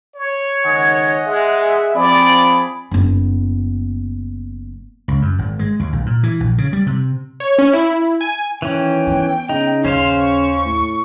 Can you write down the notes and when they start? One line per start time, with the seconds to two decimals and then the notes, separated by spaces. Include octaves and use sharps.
0.15 C#5
0.66 C#2 D#3 D#5 F#5 G#5
1.26 G#3 G#4 E5
1.95 F3 C4 G#4 D5 B5
2.91 F#1 B3
5.08 C#2
5.22 F#2
5.39 G#1
5.59 G#3
5.80 D#2
5.93 B1
6.06 A#2
6.23 E3
6.40 A#1
6.58 C#3
6.73 G3
6.86 C3
7.40 C#5
7.58 C#4
7.73 E4
8.21 G#5
8.62 D#3 E3 C#4 G5
9.07 B3
9.49 C#3 D#4
9.85 D#2 C#4 C5 F5 C6
10.21 C#6
10.65 A2